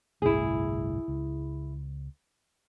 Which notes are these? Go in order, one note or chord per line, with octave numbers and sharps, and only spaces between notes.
G1 C2 A2 E4 G#4
C#2